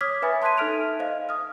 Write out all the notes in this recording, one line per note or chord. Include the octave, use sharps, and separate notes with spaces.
C#5 D6 D#6 F6 G#6 B6
B4 E5 G#5 B5 D#6 A6
A5 C6 F#6 G#6 B6 D#7
D#4 A4 E5 F6 D7 F7
C5 D#5 F5
D#6 F6